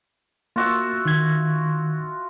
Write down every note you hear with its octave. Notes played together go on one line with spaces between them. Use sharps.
A#3 F4 F#4 E5
D#3 G#6